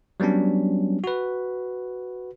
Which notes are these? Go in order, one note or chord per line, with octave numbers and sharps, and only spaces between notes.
F#3 G3 B3 C#4 D4
F#4 B4